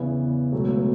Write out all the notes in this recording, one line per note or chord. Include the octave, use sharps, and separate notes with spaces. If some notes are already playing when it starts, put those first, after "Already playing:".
Already playing: E2 C#3 E3 B3
C#2 B2 F#3 A3
A3
B3